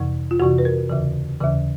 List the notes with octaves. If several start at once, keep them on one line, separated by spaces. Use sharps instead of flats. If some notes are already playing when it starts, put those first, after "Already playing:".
Already playing: F2 C3 E3
F4
F2 C3 E3 F#4
B4
A#4
D#2 C#3 E3
D#2 C#3 E3